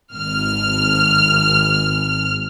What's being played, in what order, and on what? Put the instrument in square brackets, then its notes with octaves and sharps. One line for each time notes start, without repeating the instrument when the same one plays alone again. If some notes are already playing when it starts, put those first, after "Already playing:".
[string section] G#1 F6